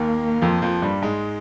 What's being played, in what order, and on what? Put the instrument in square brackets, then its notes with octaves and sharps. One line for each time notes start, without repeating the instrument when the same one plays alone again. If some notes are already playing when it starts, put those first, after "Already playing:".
Already playing: [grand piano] D#2 D#3 [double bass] A#3
[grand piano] F2 F3
F2 F3
G2 G3
G#2 G#3